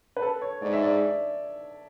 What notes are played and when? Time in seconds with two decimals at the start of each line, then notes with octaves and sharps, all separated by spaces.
0.17 B4
0.22 A4
0.42 C#5
0.62 G#2 D5
0.73 E5
0.84 D5